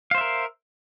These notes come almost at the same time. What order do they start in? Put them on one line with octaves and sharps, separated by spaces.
F5 C5 E5 A#4